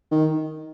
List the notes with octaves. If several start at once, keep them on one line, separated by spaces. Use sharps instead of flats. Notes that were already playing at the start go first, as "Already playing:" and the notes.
D#3